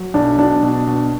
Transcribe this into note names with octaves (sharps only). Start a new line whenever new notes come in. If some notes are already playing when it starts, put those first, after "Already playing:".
Already playing: F#3
B1 D4
B2 D4
B2
B2